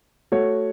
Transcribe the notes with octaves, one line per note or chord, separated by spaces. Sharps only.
A3 F#4 C#5